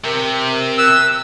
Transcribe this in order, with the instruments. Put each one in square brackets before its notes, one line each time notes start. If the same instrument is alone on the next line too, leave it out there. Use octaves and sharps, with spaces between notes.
[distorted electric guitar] C3 [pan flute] A#4
[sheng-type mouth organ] E6 [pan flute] F#6